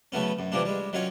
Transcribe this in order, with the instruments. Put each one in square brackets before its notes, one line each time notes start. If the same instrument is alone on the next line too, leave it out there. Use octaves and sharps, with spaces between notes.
[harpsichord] C#3 F#3 A3 B3 C#4
F#2
E3 F3 G3 A#3 D4
G3 G#3
D#3 F#3 C#4 F4 C#5